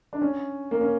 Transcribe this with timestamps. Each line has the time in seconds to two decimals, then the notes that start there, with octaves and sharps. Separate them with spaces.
0.13 D4
0.22 C#4
0.71 A#3
0.81 C#4